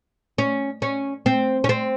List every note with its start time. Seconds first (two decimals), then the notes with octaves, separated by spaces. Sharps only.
0.38 C#4
0.82 C#4
1.26 C4
1.64 C#4
1.69 C4